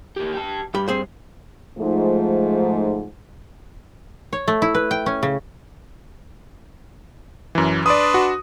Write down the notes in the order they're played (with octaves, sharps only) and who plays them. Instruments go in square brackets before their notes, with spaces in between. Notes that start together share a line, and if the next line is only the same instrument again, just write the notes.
[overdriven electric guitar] A#3 G4
G4 A5
[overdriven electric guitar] G2 [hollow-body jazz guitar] G4 B5
[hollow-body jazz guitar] C4 G#4 C5
[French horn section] G#2 F3 A3
[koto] C#5
A3
E4
B4
G5
C#4
C#3
[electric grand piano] F#2 E3
[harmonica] D4 B4 C6 [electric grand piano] D5 D#6
[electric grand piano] F#4